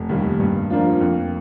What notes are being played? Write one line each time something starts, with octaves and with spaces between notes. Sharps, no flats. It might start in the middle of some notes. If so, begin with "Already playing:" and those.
Already playing: F1
D#2 D#3 G3
G2
F3 A#3 D4 F4
F2